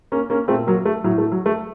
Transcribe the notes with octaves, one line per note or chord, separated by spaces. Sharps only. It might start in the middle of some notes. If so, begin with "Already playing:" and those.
A#3 C#4
A#3 C#4
A#2 A3 C4
F#3 A#3
A3
A2 F#3
A3
F#3
A3